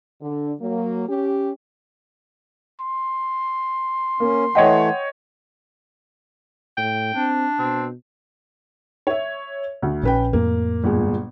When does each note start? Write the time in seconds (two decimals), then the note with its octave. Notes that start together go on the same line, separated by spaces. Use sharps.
0.22 D3
0.61 F#3 A#3
1.09 C#4 G4
2.81 C6
4.20 A#3 C#4
4.55 E3 A3 C#5 D#5 F#5 G5
6.77 A2 G5
7.16 C4 D4
7.59 B2 C4
9.07 C#5 E5
9.82 D2
10.03 A#1 C#4 B4 G5
10.33 F2 A2 A#3
10.84 G1 A#2 G#3